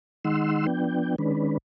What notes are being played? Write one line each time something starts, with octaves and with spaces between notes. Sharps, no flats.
D#3 G#3 D#4 F#5 C6 E6
F3 B3 D4 G5
D#3 G#3 C#4 D4 B4